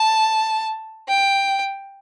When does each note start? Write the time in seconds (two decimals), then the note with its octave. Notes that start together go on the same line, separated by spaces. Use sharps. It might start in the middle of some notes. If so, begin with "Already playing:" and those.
Already playing: A5
1.09 G5